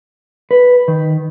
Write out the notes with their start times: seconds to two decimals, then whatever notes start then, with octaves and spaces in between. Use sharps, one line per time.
0.51 B4
0.88 D#3